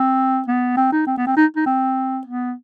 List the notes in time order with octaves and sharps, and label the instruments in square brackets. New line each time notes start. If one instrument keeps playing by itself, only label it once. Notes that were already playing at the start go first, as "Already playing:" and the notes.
Already playing: [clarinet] C4
B3
C4
D#4
C4
B3
C4
D#4
D#4
C4
B3